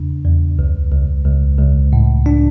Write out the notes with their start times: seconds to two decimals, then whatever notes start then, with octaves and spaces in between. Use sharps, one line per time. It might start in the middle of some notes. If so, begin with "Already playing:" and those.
Already playing: E2 C#3 D4
0.25 E2
0.59 C#2
0.92 C#2
1.25 C#2
1.59 C#2
1.93 A2
2.26 D4